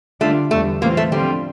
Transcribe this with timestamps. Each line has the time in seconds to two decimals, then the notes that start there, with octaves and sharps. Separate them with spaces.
0.21 D3 G3 A3 D4 F4
0.51 E2 D3 G3 A3
0.81 A2 E3 A3 A#3 C4 F4
0.97 A3
1.11 D3 F3 G3 C4 F4